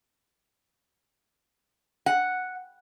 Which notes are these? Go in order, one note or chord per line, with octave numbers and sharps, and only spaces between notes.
F#5